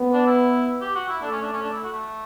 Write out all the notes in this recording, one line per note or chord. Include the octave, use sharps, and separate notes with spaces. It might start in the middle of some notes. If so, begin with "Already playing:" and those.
Already playing: B3
D4
E4
G4
F#4
E4
A3 D4
C#4
D4
C#4
D4
E4
F#4
A3